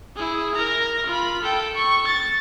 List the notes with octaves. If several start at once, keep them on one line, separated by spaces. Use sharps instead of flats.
E4 G#4
A#4 A#5
F4 B5
A4 G5
C#6
A6